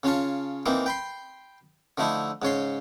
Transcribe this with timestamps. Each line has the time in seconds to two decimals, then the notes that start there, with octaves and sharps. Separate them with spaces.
0.03 C#3 C#4 F4 A5 C#6
0.66 E3 A#3 C4 D#4
0.86 G5 B5 C6
1.98 D3 F3 A3 D#4 E4
2.42 G#2 C#3 C#5 C6